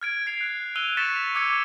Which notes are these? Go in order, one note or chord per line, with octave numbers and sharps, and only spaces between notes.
F6 G#6 D7
G#6 C7 D7 F7
F#6
E6 F#6 D#7 F7 G7
C#6 A6 B6 C#7 D7 E7
D6 E6 G#6 C#7